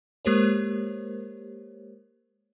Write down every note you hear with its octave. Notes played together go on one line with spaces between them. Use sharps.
G#3 A#3 G4 A#4 C5 C#5